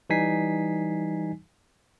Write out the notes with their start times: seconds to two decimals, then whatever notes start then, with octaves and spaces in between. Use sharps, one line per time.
0.10 E3 G3 D#4 G#5 B6 C7